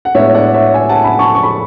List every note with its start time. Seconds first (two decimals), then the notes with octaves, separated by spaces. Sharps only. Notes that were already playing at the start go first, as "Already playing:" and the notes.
0.05 F#5
0.15 A2 G#3 B3 D4 C#5 E5
0.34 D5 F#5
0.54 C#5 E5
0.74 E5 G#5
0.89 F#5 A5
1.04 G#5 B5
1.19 A5 C#6
1.35 C#6
1.43 B5